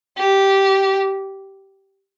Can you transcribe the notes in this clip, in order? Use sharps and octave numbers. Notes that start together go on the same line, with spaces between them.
G4